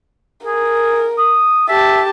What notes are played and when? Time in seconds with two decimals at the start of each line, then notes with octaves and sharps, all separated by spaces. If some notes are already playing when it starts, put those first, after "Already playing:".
0.45 G#4 A#4
1.18 D#6
1.69 G4 E5 A5